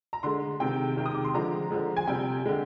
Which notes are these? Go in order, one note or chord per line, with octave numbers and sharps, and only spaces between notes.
A#5
D3 G#3 C6
C3 D#3 G#3 G5
C3 D#3 G#3
D#6
D6
C6
D3 F3 G#3 A#5
D3 F3 G#3
G#5
C3 G3 G5
D3 G#3